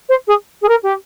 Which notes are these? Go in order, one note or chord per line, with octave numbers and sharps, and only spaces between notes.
C5
G#4
G#4
A#4
G4